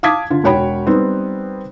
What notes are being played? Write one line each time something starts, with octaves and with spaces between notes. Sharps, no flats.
F5 A5 D6 D#6 G#6 B6
D3 F4
E1 F#4 C#5 G5 B5
G3 B3 C4 D#4